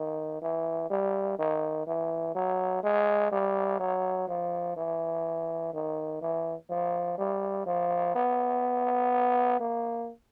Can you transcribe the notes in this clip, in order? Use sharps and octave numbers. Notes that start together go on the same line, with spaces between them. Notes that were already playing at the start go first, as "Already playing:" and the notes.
Already playing: D#3
E3
G3
D#3
E3
F#3
G#3
G3
F#3
F3
E3
D#3
E3
F3
G3
F3
B3
A#3